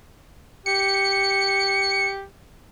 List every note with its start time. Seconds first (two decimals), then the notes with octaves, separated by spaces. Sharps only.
0.66 G4 C#7